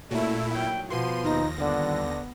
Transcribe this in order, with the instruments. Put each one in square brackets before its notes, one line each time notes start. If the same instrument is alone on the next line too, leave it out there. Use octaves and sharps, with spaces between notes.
[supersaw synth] A#2 E4 [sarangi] A3 [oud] C#4 F#4
[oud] D#3 F#3 [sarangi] G5
[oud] B2 B3 F#4 [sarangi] F3 [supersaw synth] C6 D#7
[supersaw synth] D#2 A#6 [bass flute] D#4
[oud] G2 F3 [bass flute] D3 [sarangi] B3